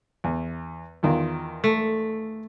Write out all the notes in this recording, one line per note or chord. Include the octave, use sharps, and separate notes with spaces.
E2
E2 D#3 F4
A3